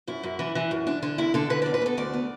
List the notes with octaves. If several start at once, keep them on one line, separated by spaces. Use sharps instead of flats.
F#2 E4
F#2
E3
E3
F#2
D4
D3 D4
E2 E4
D3 A4
D3 B4
E2 D5
B4
B3 A4
D2 D5
B3